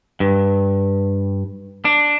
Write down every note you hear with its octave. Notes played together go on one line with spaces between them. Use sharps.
G2
D4